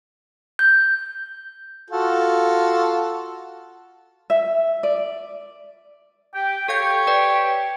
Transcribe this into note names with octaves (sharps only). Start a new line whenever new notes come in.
G6
F4 F#4 A4
E5
D5
G4 G5
G4 A4 C#5 F5 G6
B4 D5 G5